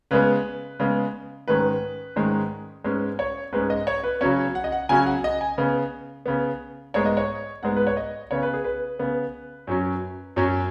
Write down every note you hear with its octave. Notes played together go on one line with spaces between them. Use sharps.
C#3 G#3 B3 B4
C#3 G#3 B3
G#2 D#3 G#3 C#4 B4
G#2 D#3 G#3 C#4
G#2 G#3 C#4 B4
C#5
G#2 G#3 C#4 B4
D#5
C#5
B4
C#3 F#3 C#4 C#5
F#5
D#5
F#5
C#3 F#3 C#4 G#5
F#5
D#5
G#5
C#3 B3
C#3 B3
G#2 G#3 B3 C#5
D#5
C#5
G#2 G#3 B3 F#5
B4
C#5
D#5
C#3 B3 C#5
B4
G#4
B4
C#3 B3
F#2 F#3 C#4
F#2 F#3 C#4